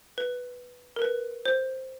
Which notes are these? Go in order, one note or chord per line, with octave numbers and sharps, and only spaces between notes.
B4
A#4
B4
C5